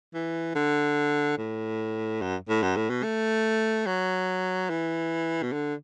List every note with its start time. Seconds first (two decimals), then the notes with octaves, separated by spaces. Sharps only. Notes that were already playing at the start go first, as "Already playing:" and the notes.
0.14 E3
0.55 D3
1.38 A2
2.21 F#2
2.49 A2
2.63 F#2
2.77 A2
2.90 B2
3.03 A3
3.87 F#3
4.70 E3
5.43 B2
5.52 D3